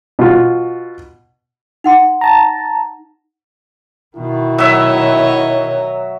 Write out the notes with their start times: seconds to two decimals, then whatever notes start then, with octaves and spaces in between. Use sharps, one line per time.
0.19 B2 F4
1.84 D#4 F#5 C6
2.21 A5 A#5
4.16 B2 D#3 E4
4.58 F#3 C#5 D#5 E5